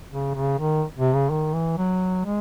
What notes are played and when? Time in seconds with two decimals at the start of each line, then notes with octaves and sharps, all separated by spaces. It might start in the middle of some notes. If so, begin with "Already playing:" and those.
0.11 C#3
0.35 C#3
0.59 D#3
0.98 C3
1.15 C#3
1.30 D#3
1.53 E3
1.78 F#3
2.25 G#3